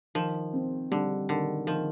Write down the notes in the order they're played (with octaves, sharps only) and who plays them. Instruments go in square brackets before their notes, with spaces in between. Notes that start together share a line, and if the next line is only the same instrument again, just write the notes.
[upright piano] D#3 [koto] F3
[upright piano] C4
[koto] D3 [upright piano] G3
[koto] D3 [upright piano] D#3
[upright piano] D#3 [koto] F3